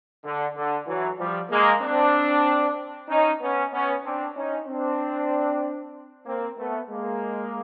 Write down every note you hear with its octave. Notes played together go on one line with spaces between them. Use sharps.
D3
D3
E3 F#3
F3 G3
G#3 A#3
C4 D4
C#4 D#4
B3 C#4
B3 C#4
C4 D4
C#4 D#4
C4 D4
A#3 C4
A3 B3
G#3 A#3